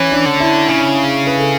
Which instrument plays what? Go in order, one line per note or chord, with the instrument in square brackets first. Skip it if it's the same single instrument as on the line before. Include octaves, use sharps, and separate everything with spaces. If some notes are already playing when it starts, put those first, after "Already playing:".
Already playing: [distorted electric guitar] E3 [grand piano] C#4
[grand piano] D4
[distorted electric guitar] D3
[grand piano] E4
[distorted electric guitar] C#3
[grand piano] B4
A4